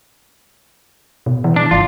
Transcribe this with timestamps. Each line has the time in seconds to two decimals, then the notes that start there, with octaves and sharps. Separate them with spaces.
1.26 B2
1.44 E3
1.56 D4
1.71 G1 F4